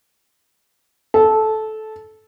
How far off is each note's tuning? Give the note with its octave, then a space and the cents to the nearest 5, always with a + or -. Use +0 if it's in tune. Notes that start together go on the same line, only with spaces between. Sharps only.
A4 -15